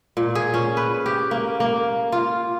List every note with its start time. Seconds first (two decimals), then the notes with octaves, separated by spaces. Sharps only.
0.17 A#2
0.35 G#4
0.54 C#4
0.77 B4
1.06 G4
1.31 A#3
1.60 A#3
2.12 F4